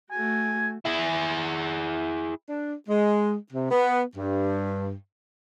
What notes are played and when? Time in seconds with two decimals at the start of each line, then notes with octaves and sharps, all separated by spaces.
0.11 A3 F#4 G#5
0.85 E4 G#4
2.49 D4
2.89 G#3
3.52 C3
3.71 B3
4.16 G2